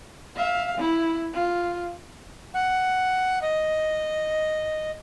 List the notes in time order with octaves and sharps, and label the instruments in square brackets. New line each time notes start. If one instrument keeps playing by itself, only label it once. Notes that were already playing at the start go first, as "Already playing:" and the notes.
[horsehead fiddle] E5 F5
E4
F4
[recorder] F#5
D#5